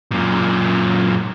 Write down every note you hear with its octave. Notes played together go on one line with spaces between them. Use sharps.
F#2 A#2